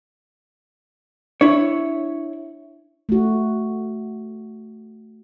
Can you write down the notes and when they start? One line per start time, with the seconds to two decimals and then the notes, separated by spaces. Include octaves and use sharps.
1.41 D4 E4 C#5
3.09 A3 F#4